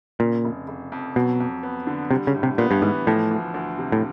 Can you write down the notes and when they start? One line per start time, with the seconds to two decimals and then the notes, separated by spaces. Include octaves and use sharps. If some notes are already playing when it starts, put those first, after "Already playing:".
0.20 A#2 C#3
0.45 F1
0.68 F1
0.92 F2
1.16 B2 F#3
1.40 F2
1.63 B3
1.87 D3
2.11 C3 G3
2.27 C#3
2.35 A2
2.43 C3
2.58 A#2 B3
2.71 G2
2.82 G#2 E3
3.07 A2 F3
3.31 D2
3.54 D2
3.78 C3
3.92 A2